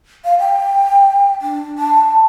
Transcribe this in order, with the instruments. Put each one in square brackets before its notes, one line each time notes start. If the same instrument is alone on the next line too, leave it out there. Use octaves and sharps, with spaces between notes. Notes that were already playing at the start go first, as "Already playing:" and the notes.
[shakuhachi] F5
G5
D4
A5